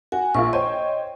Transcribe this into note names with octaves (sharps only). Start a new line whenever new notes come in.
F#4 G#5
A#1 A#3 F4 C#6
C5 C#5 D#5 G5